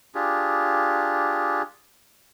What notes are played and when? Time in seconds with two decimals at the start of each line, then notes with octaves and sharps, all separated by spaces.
0.15 D4 F4 G4 G#4